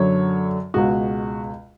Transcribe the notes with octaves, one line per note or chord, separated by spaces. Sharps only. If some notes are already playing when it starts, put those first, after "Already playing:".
Already playing: F#2 D3 F#3 C#5
C#2 B2 G#3 F#4